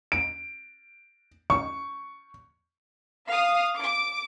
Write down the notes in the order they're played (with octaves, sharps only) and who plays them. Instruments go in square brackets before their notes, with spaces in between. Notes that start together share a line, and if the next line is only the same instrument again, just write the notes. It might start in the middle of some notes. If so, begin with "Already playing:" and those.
[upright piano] D7
C#6
[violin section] F5 D#6
D6